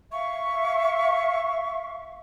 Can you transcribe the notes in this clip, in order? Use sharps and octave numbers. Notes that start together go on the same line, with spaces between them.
E5 F5 C#6